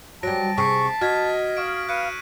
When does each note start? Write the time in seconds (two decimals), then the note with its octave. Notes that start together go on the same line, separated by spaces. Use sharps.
0.23 F#3 G3 A5 A#6 D7
0.58 C3 G#4 C#6 B6 C7
1.01 F#4 D#5 F6 G#6 B6
1.57 F5 C#6 D#6 D7
1.89 B4 F5 F#6 C#7 D#7